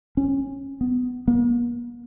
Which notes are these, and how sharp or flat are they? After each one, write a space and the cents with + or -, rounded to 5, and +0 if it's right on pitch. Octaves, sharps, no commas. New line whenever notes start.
C#4 -15
B3 +15
A#3 +45